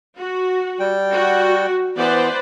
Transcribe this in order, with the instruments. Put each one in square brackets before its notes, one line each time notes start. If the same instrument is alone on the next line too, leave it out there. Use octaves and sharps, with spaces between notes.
[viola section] F#4
[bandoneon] G3 G5
[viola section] F#4
[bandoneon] E3 B3 [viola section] B4 C5 D5